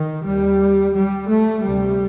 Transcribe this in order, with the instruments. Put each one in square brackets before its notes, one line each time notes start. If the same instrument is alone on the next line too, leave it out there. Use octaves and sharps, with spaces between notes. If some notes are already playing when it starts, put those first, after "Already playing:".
Already playing: [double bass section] D#3
D#2 G3
G3
A3
D2 C3 G3